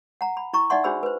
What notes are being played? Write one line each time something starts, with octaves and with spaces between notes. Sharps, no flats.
F#5 A#5
B5
E4 A#5 C#6
D#4 D5 E5 F#5 C6
D4 F#4 G#4 C5 B5 E6
B4 C5